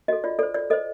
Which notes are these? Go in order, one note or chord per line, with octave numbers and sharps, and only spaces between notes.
F#4 A4 D#5
F4 D5
A4 C5 D5
F4 D5
A4 C5 D#5